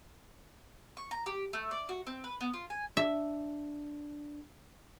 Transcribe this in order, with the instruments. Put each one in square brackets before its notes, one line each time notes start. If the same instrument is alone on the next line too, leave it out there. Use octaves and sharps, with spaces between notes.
[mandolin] C#6
A#5
G4
A3
D5
F#4
C4
B4
B3
F4
G#5
[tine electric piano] D4 [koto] E5